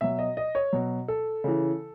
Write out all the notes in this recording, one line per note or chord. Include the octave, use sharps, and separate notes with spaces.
B2 F#3 E5
D#5
D#5
C#5
B2 F#3
A4
C#3 E3